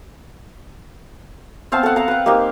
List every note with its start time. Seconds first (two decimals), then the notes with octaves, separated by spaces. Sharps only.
1.72 B3 C4 F5 A5
1.83 A4 F#5
1.96 F5 F#5 A#5
2.08 B4 G5
2.26 A#3 C4 D#4 G4